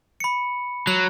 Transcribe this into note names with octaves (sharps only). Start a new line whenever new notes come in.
B5 C#7
F#3 F#6